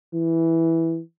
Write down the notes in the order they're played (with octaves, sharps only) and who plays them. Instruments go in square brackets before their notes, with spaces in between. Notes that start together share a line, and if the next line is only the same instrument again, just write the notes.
[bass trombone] E3